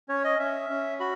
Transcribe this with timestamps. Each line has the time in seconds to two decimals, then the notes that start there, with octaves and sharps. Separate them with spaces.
0.09 C#4 C#5
0.24 D#5
0.39 C#4 E5
0.70 C#4
1.00 F#4 B5